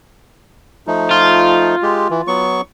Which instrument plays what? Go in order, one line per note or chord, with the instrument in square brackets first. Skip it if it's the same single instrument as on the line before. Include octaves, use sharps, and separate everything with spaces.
[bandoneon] F3 A3 D#4
[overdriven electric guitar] F4
[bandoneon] G#3 G4
E3
F#3 B3 C#6